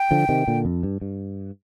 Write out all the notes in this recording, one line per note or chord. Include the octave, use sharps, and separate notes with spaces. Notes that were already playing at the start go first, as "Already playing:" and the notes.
Already playing: G5
D3 F3
C3 D#3
A#2 D3
F2
G2
G2